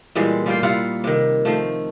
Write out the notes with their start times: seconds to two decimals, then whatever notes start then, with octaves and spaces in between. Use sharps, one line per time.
0.15 A#2 E3 G3 G#3
0.46 G3 A#3 F4 G5
0.63 G3 E4 F4 F#5
1.04 C3 D#3
1.45 D#3 F3 A3